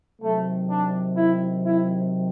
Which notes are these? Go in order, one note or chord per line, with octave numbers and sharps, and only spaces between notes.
C3 D#3 F#3 A3
D4
E4
E4